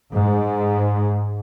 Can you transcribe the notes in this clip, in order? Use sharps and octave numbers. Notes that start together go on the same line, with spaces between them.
G#2